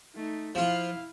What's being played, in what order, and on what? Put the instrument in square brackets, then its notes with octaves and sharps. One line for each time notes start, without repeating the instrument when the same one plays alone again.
[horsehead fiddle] A3 D#4
[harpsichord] F3 F4 [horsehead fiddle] E4 F5